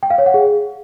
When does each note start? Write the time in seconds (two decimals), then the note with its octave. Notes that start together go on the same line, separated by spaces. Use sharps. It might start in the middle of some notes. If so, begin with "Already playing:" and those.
0.03 G5
0.10 F5
0.18 C#5
0.26 F#5
0.34 G#4